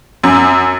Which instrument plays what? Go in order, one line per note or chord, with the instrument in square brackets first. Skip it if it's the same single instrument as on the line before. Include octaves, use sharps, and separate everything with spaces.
[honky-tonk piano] F#2